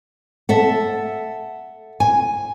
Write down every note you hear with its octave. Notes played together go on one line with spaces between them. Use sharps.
A4 E5 F#5
G#5